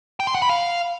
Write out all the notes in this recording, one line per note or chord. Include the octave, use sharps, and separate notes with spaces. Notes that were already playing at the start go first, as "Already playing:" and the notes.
G5
C6
F#5
B5
F5